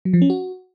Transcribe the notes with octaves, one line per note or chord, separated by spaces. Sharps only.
F#3
F3
C#4
F#4